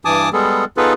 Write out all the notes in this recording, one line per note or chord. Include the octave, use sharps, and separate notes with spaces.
G2 E3 G#5 A5 D6 D#6
G3 G#3 B3 G#4 A4
B3 D#4 F4 G#4 A4 B4